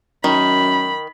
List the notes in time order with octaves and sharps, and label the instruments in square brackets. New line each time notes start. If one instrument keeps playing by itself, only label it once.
[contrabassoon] F#2 [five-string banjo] D#3 [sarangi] B5